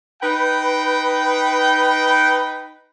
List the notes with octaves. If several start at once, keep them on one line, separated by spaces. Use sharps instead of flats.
D#4 B4 G5